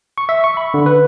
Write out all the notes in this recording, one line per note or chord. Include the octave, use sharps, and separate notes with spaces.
C#6
E5
C#6
B5
D3
B4